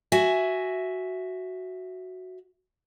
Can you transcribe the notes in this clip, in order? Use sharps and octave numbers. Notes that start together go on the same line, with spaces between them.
F#4 E5 G#5